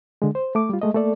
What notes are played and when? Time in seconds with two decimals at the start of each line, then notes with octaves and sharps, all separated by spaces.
0.22 D3 G#3
0.35 C5
0.55 A3 D6
0.69 G3 F4
0.82 G#3 A3 D#5
0.94 A3 A#3 A4 D5